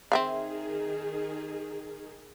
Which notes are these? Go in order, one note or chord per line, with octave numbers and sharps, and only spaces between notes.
D#3 C4 G#4 E5 F5